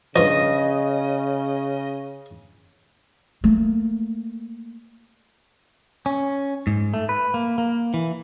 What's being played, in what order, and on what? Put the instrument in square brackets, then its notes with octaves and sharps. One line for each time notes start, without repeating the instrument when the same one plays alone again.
[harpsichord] G2 F3 [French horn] C#3 [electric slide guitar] D#5
[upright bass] A3 A#3
[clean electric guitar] C#4
G#2
A3
B4
A#3
A#3
E3